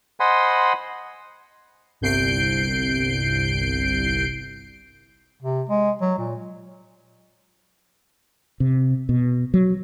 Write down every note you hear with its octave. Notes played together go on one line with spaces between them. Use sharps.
C5 D#5 F#5 G#5 B5 C6
G1 C2 G6 C7 D7
C3
G#3
F#3
A#2
C3
B2
F#3